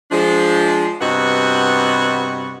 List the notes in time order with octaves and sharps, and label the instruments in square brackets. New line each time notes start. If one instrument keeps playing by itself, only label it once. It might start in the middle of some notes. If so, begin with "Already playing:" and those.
[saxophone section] F3 G#3 D4
G2 C3 B3 F#4 D#5 F#5